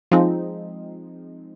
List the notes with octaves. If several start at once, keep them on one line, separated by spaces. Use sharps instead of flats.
F3 G#3 C4 D#4